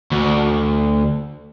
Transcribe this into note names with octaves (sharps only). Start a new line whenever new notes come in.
D2